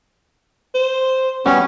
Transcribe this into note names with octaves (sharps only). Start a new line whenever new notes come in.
C5
G3 B3 C#4 F#4